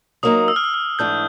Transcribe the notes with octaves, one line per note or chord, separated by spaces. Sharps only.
F#3 A#3 D#4 D#6
E6
F6
E6
F6
G#2 E3 A3 D4 G6